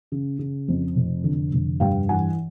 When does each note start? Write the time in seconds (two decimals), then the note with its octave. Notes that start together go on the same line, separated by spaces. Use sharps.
0.12 C#3
0.39 C#3
0.68 F2
0.96 F1
1.24 D3
1.52 F1
1.80 G2 F5 G5
2.09 E3 F#5 G#5